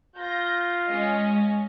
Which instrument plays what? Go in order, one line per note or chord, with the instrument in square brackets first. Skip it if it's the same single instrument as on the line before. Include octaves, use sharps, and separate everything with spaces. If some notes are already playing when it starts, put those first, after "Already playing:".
[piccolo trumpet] F4 [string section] G6 A#6
[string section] G#3 C#4 D#5